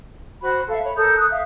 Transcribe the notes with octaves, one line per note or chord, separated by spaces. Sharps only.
F#4 C5 B5
A4 E5 F5
C#5 B5
A4 A#4 D#6 G6
D#6 F#6
E5 F5